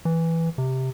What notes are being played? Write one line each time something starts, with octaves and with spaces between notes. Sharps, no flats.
E3
C3